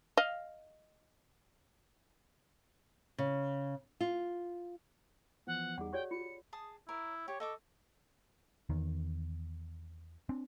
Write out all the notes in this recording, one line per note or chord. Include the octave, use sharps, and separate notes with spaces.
D#5 F5
C#3
F4
E3 F3 B3 F#5
E2 G3 D#4 G#4 F#5
F#4 G4 C#5 D5 G5
F4 C#7
G#4 A5 D#6
E4 A#4 C#5
G4 C#5
A4 D#5 C#6 D6
E2 D#3
C4 D4